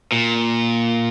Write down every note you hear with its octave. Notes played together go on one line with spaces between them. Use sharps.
A#2